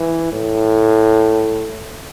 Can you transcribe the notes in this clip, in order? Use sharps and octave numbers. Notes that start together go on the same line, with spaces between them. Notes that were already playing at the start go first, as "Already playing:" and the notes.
Already playing: E3
A2